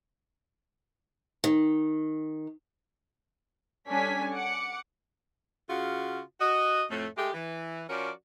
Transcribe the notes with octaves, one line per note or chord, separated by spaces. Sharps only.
D#3
G3 C#4 D4 A4 G#5 B6
F#5 D6 C#7
C#3 F4 F#4
F#4 D#5
F2 A2 A3
G#3 A3 G4
E3
F3 C#4 F#4 A#4 D5